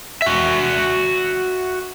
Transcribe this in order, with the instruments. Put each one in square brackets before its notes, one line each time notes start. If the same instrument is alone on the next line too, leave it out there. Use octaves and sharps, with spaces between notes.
[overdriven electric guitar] F#4 E5